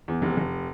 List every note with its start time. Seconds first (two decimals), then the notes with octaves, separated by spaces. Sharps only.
0.08 E2
0.22 F1
0.37 F1